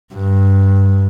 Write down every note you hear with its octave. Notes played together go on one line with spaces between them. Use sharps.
G2